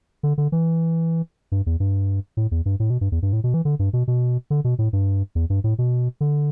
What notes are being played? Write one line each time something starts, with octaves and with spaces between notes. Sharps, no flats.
D3
D3
E3
G2
E2
G2
A2
E2
G2
A2
B2
G2
E2
G2
A2
B2
E3
D3
G2
B2
B2
D3
B2
A2
G2
E2
G2
A2
B2
D3